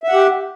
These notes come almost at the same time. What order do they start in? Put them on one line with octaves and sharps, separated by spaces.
E5 F#5 G4